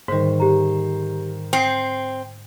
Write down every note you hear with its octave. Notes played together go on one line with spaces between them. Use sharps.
G#2 D3 D#3 G3 C5
G4 A#5
C4 C7 C#7